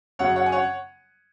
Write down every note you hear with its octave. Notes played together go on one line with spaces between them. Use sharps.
F#2 C#3 F#3 C#5 F#5
C#5 F#5
G#5
C#5 F#5